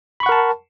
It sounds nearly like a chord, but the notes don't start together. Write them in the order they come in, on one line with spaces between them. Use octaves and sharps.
B5 C#6 F#5 A#4 A5